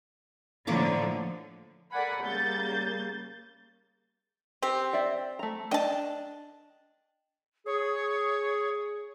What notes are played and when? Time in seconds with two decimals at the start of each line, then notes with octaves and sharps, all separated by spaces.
0.67 A2 D3 F3 A#3 C#5 D6
1.92 A4 A#4 D5 F#5 G#5 B5
2.23 C#3 G3 A#3 G6 A6
4.63 C4 G4
4.93 D5 E5 G5
5.39 A3 A#5
5.71 D4 D#5 G5 A5
7.66 G#4 C#5